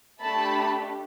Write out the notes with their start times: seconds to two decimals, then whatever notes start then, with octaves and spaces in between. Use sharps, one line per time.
0.22 A3 D4 G4 A5 B5